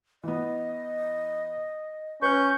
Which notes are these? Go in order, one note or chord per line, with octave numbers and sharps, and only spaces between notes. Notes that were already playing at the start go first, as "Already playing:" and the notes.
E3 B3 D#5
C#4 B4 C#6 F#6 G6